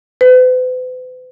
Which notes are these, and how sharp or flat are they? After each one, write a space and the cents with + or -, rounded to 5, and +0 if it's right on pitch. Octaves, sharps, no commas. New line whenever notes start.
B4 +45